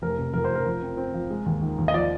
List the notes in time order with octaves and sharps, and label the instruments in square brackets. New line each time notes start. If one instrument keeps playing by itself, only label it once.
[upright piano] F1 A#4
C3
F2 A#4
C5
F1
A#4
F3
C4
C4
F3
G#3
D#2
D#3
D#2
D#5
F3 D5